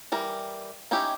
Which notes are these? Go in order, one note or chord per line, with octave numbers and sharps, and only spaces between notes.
E3 G3 A#4
D#3 C#4 D#4 E4 G4